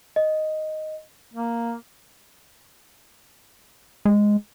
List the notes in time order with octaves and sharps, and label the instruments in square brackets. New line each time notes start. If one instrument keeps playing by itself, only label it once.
[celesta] D#5
[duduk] A#3
[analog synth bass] G#3